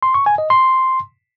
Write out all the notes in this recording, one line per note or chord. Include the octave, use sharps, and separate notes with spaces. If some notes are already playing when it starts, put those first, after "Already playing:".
C6
C#6
G#5
D#5
C6